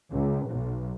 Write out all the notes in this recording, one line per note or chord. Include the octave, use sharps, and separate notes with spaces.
C#2
B1